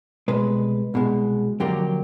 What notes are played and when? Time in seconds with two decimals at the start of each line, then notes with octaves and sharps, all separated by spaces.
0.28 C2 B2 G#3 B4
0.94 C2 B2 G#3
1.60 F2 D3 F#3 A#3 G4